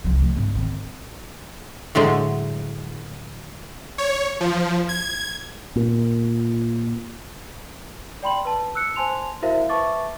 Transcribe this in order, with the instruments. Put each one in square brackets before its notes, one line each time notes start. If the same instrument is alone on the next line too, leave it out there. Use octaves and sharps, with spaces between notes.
[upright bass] C2 F3
D2
G#2 C4
D#3 C4
[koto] A2 D3 F#3 G#3
[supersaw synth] C#5
F3
G#6
[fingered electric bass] A#2
[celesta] D5 G5 B5 C6 F#7
B4 A5
E6 F#6 C#7
C5 G#5 A5 C6 F7
E4 F#4 A#4 C5 E5 F5
B4 E5 A5 C#6 D6 A6